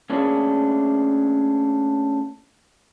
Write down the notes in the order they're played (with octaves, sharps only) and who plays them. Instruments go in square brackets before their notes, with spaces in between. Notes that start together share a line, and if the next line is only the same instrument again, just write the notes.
[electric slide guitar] A3 A#3 C#4 D4 E4 G#4